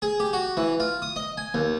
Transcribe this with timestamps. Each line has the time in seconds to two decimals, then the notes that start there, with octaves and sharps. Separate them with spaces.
0.02 G#4
0.20 G4
0.33 F#4
0.57 E3
0.80 F4
1.02 D#6
1.16 D#5
1.37 G#5
1.54 D#2